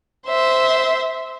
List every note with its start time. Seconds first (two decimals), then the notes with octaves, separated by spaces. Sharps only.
0.27 C5 E5